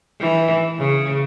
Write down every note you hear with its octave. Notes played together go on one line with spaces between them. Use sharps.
E3
C#3